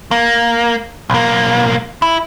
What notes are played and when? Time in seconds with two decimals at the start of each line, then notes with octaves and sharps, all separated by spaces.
0.11 A#3
1.10 B1 A#3
2.02 E4